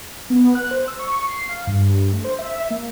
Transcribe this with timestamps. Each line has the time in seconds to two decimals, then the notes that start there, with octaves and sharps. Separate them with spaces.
0.30 B3
0.55 F#6
0.71 C5
0.88 E6
0.99 C#6
1.27 C7
1.49 F5
1.67 G2
2.13 A3
2.24 C5
2.39 E5
2.70 A#3